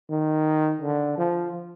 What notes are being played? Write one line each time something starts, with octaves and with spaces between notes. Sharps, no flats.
D#3
D3
F3